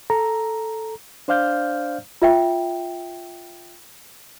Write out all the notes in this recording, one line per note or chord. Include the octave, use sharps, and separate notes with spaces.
A4 A#5
D4 C5 D5 F5 F6 G6
F4 E5 G5